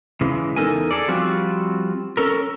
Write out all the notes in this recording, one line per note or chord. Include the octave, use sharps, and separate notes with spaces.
C#3 E3 G#3
E2 G3 D#4 A4 A#4 G#5
G#4 A4 D5
F3 G3 C4 F4 F#4
C#4 A4 A#4